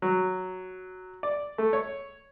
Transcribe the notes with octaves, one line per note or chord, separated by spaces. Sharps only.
F#3
D5
A3
C#5